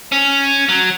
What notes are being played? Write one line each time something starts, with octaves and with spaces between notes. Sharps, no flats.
C#4
F#3